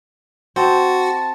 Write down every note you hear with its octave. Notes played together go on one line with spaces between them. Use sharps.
C4 F#4 A5